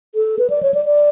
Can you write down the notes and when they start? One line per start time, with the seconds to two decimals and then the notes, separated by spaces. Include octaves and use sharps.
0.15 A4
0.39 B4
0.50 D5
0.63 C#5
0.74 D5
0.86 D5